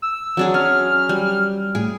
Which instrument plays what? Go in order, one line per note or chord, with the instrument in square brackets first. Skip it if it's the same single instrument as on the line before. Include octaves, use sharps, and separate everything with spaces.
[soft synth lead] E6
[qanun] F#3 D4 G#4
[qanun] C#4 [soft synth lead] F6
[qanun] G3
[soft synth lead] A2 [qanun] G#4